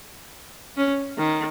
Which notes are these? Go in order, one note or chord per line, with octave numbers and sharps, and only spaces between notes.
C#4
D#3